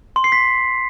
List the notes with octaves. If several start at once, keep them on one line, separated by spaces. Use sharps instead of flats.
C6
C7
B6